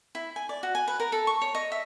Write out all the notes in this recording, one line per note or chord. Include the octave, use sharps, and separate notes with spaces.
E4
G#5
D5
F#4
G#5
B4
A#4
A4
C#6
C#5
D#5
E5